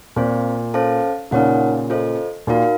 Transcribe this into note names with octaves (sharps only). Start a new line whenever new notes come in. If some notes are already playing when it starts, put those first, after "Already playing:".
A#2 C4 F4 C5
C#4 A4 C5 F5 A5
A#2 C#3 D#4 A#4 C#5 F#5
F4 A4 C5 D#5
A#2 D#4 F#4 A#4 F5